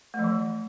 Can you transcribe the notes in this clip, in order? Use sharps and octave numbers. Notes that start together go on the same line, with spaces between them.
A3
F3
E3